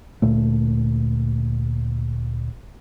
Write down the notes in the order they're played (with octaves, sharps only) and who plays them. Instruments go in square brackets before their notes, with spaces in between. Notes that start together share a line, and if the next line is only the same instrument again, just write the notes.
[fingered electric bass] D2 A#2 A3